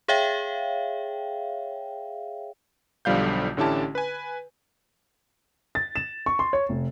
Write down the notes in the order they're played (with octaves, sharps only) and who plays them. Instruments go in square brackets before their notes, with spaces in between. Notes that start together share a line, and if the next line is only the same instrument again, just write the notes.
[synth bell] G#4 C#5 E5 F5 G5
[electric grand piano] B1 D3 F3 G3 F5 G6
A1 D3 C#4 E4 G4 A5
B4 G#5
[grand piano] A6
E7
C#6
C6
C#5
F1